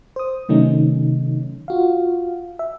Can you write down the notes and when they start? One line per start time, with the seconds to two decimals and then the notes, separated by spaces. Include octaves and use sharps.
0.16 C5 D#6
0.49 C3 D#3 F#3 A3 C#4 D#4
1.68 F4 F#4 F5
2.59 E5